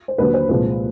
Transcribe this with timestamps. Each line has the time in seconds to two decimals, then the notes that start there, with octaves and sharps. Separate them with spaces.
0.08 C5
0.18 D#2 D3 F#3 B4
0.34 C5
0.49 C2 A#2 F3 G#3 B4